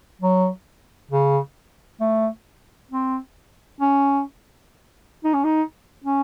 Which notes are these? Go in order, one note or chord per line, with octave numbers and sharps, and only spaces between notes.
F#3
C#3
A3
C4
C#4
D#4
C#4
D#4
C#4